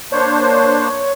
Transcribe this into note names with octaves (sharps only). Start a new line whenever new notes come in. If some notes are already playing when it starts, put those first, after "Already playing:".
A#3 D4 C5 C#5